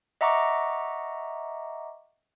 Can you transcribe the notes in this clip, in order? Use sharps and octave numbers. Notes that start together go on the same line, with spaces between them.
D#5 E5 F#5 A#5 C#6 D6